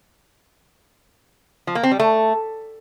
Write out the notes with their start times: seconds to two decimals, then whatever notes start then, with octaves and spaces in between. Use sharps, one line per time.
1.67 F3
1.75 A#3
1.83 C4
1.91 G3
2.00 A3